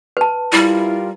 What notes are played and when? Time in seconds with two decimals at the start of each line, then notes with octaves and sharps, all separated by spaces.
0.17 B4 A5
0.52 G3 E4 F4 G4 A#4